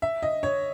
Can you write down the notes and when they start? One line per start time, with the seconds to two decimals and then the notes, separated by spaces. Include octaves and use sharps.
0.02 E5
0.22 D#5
0.43 C#5